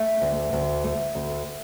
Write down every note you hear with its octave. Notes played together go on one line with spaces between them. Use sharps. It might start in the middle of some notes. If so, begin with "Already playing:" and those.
Already playing: A3
D2
D2
A3
D2